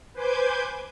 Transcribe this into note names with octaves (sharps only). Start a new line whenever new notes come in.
B4 C5 G#5 D6 G6 G#6